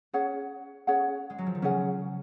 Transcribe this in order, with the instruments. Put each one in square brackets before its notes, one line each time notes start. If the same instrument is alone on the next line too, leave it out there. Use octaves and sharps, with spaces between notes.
[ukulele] C#4 G#4 C#5 F#5
C#4 G#4 C#5 F#5
[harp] G#3
F#3
F3
D#3
[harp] C#3 [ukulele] C#4 G#4 C#5 F#5